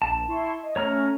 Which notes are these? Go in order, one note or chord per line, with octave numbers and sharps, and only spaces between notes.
A#1 A5
E4 C6 C#6
D#5
A3 C#4 C#5 A#5 F6